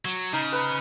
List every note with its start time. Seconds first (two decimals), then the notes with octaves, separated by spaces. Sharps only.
0.05 F#3
0.33 C#3 D#4
0.52 B4